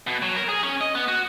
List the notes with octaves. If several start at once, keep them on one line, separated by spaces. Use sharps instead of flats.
B2
F#3
A#4
G#4
C#4
D#5
B3
F#4